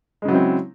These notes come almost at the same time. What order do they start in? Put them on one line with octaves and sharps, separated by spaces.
G#3 C#3 F#3 E4 C4